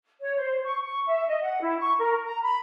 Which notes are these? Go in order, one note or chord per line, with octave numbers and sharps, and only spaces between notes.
C#5
C5
C#6
C#6
E5
D#5
F#5
E4
C#6
A#4
A#5
B5